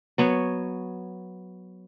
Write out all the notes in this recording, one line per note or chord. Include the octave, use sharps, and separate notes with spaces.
F#3 B3 C#5